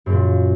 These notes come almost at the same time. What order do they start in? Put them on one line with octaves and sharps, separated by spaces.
F#2 A#3 A#2